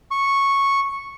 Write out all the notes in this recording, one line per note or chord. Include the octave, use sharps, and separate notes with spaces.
C#6